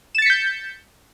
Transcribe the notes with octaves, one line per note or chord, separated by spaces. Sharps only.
G6 A6 B6 C#7 E7